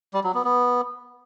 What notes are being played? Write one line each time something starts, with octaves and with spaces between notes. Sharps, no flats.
G3
F#3
B3
B3